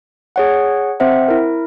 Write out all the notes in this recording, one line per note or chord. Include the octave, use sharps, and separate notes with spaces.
G#4 C#5 F#5
C4 C5 E5 F#5
E4 A#4